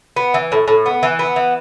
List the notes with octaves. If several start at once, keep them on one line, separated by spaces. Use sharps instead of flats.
B3
E3
A2
A2
B3
E3
B3
E3